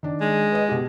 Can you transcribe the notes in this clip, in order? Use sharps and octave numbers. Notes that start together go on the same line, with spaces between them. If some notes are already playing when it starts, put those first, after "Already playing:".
D#3 D4
G#3
B4 D#5
B2 G4